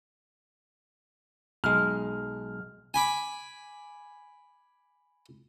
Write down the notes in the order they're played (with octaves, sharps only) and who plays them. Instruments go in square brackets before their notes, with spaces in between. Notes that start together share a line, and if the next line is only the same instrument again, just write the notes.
[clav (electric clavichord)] B1 G#3 [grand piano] F6
[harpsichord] G#5 B5 D6